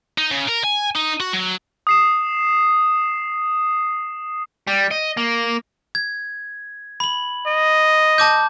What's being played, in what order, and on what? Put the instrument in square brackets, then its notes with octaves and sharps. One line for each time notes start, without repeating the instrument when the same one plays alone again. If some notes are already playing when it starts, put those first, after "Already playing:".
[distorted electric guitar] D#4
C#3
A#4
G#5
D#4
F#4
F#3
[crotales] D#6 C7 E7
[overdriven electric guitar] G3
D#5
A#3
[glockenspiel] G#6
B5 F#7
[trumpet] D#5
[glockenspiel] A5 D6 G6